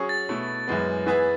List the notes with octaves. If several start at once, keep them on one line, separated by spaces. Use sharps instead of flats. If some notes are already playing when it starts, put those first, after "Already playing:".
Already playing: F#3 C#4 G#4 C#5
A6
B2 A3 E4
F#2 E3 G#3 B3
E3 B3 E4 G#4 B4